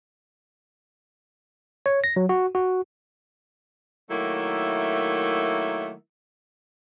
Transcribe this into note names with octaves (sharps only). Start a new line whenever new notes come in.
C#5
A#6
F#3
F#4
F#4
D#3 F#3 A3 A#3 E4